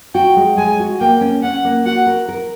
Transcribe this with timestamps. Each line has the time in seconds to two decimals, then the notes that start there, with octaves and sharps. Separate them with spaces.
0.14 F#4 G5
0.37 G#3
0.58 G#3 G#5
0.79 F#4
1.00 A#3 G5
1.21 C#4
1.43 C#4 F#5
1.65 A#3
1.86 F#4 F#5
2.07 A#4
2.28 A#4